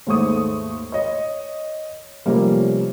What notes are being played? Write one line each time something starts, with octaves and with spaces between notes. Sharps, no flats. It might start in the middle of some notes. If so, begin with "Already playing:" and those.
D#2 G#2 A3 C#6 D#6
C#5 D#5
C3 F3 G3 A3 A#3 C#4